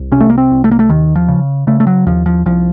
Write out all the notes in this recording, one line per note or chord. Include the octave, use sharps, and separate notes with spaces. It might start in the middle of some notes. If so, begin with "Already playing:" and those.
Already playing: C2
C3 C#4
A3
A#3
C4
C2
A3
A#3
A3
D#2 D#3
F3
C#3
C#3 A3
A3
F#3
D#2 F3
F3
C2 F3